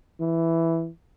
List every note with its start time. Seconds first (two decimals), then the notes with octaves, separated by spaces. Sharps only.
0.21 E3